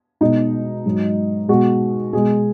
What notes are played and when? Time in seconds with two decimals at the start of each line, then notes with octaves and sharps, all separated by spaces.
0.21 B2 G#3 D#4
0.85 G#2 F#3
1.48 B2 G#3 F#4
2.13 B2 G#3 G#4